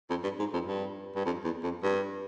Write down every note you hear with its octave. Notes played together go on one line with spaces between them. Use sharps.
F2
G2
G#2
F2
G2
G2
F2
E2
F2
G2